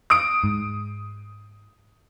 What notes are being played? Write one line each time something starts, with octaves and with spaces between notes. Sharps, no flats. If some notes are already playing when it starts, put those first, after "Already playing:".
D#6 D7
G#2